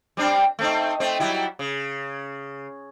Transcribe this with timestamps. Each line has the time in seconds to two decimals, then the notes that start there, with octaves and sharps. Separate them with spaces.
0.17 G3 C4 D4
0.59 A3 C4 D#4
1.00 A3 C4
1.20 F#3 G3 E4
1.59 C#3